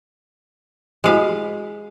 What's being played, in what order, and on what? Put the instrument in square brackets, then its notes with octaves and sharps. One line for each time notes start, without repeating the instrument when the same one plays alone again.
[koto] G#3 F5 [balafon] E4 F#4 G4